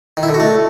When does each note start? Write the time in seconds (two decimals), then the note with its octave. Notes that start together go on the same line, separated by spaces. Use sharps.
0.17 D#3
0.23 E4
0.29 D3
0.34 F#4
0.40 A3